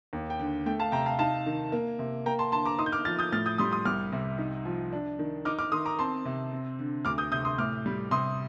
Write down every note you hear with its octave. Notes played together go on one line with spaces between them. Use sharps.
D#2
G5
D3
A3 G5
F5 A5
C3 G5 A#5
F5 A5
D#4 F5 A5
D#3
A#3
C3
A#3 G5 A#5
A5 C6
D3 A5 C6
A#5 D6
D#4 C6 D#6
G6
D6 F6
F3 F6 A6
D#6 G6
A2 F6 A6
D#6 G6
G3 C6 D#6
C6 D#6
C2 D6 F6
C3
D#4
F3
D4
D#3
D#4 D6 F6
D6 F6
D#3 C6 D#6
A#5 D6
C4 A5 C6
C3
C4
D3
D2 D6 F6
D#6 G6
C3 D#6 G6
C6 D#6
A2 D6 F6
G3
C3 C6 D#6